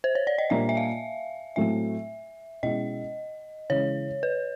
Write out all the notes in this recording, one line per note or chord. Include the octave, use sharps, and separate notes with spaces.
C5
C#5
D5
D#5
A#2 G3 A#3 D4 E5
E5
F5
A2 F#3 A3 C4 E5
B2 G#3 C#4 E4 D#5
C#3 E3 G#3 C#4 C#5
B4